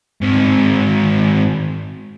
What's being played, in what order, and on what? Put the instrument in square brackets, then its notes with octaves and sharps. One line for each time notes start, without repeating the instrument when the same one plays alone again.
[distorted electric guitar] G#2 C4